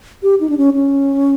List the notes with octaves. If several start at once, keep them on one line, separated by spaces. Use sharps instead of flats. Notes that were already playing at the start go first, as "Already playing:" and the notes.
G4
D#4
D4
C#4
C#4